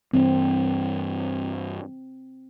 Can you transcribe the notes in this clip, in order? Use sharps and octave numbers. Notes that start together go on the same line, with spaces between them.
G2 E3 C4